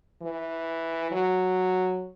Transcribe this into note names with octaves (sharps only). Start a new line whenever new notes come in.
E3
F#3